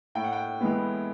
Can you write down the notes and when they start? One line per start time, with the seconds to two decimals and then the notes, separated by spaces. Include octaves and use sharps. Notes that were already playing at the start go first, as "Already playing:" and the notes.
0.15 A2 G5
0.24 F#5
0.33 G5
0.60 E3 G#3 B3